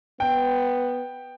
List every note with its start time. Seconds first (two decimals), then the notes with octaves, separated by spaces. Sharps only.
0.20 B3 G5